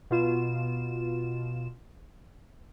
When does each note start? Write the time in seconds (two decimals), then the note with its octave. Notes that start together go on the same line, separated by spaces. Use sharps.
0.10 B2 F4 E7